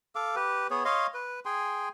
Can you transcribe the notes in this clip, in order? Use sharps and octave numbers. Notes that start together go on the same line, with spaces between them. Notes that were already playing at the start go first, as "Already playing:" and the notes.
A4 F5 D6
G4 B4
B3 G#4 C#5
C#5 D#5 F5 C6
B4
G#4 G5 G#5 C6